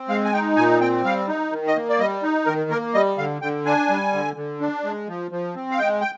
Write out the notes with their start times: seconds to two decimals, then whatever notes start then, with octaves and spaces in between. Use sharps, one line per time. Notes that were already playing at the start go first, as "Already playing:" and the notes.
Already playing: C4
0.09 G#3 F5
0.25 G#5
0.33 D#4 G5
0.57 A#2 G#5
0.81 C4 G5
1.05 G3 F5
1.28 D#4
1.52 D#3
1.68 D#5
1.76 A#3
1.89 D5
1.99 G3 D#5
2.23 D#4
2.46 D#3 A#4
2.70 A#3 A#4
2.94 G3 D#5
3.18 D3 F5
3.42 D3 G5
3.65 D4 G#5
3.89 G3
4.13 D3
4.36 D3
4.60 D4
4.84 G#3
5.08 F3
5.31 F3
5.55 C4
5.72 F5
5.79 G#3 G5
6.01 G5